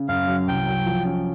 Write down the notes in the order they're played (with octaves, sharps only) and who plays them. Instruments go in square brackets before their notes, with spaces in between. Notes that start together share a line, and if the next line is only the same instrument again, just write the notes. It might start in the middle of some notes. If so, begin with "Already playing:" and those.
Already playing: [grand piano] C#3
[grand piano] F#2 [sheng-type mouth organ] F5
[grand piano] F#3
[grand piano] C2 [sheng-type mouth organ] G5
[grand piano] F#3
F3
C#4